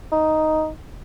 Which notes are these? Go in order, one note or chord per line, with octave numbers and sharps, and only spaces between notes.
D#4